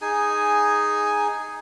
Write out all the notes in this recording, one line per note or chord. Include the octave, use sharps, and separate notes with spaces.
D#4 G#4 G#5